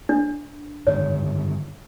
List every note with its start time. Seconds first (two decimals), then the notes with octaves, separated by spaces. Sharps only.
0.09 D4
0.87 G2 D3 D#3 C#5